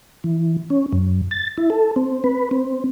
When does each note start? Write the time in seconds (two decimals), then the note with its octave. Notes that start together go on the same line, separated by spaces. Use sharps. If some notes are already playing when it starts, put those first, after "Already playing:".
0.24 E3
0.70 C#4
0.92 F#2
1.31 A6
1.58 E4
1.70 A4
1.96 C4
2.24 B4
2.51 C4